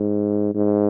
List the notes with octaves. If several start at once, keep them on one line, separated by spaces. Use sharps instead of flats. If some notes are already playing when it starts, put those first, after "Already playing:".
Already playing: G#2
G#2